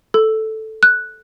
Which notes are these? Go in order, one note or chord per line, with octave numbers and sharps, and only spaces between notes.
A4
F#6